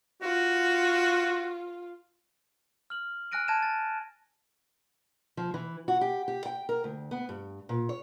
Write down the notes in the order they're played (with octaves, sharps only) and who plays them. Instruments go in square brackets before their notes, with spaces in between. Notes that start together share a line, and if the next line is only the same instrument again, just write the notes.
[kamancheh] F4 [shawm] F#4
[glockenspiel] F6 F#7
G#5 F6 F#6 A#6 D7 D#7
A5 G#6 A#6 D#7 E7
A6
[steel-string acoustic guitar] F3
E3
F#4
G4
G4
G5
A#4
D2
B3
G2
A#2
C#5